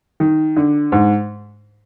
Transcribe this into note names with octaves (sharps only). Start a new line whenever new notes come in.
D#3
D3
G#2